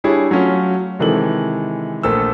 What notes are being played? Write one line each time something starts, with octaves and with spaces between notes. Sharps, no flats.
G3 D4 E4 G4 G#4 C#5
F#3 A3 C#4 F4
C3 D#3 E3 G#3 A4 F#7
A#1 A3 A4 A#4 E6